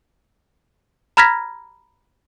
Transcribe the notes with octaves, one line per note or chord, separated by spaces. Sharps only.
A#5 B5 F6 G#6 A#6 B6